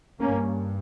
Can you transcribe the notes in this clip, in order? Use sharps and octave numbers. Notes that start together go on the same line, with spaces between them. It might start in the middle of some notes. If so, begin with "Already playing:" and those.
G2 A#3 C#4